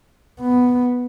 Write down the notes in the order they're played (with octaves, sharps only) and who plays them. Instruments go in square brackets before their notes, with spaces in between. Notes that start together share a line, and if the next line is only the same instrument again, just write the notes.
[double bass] B3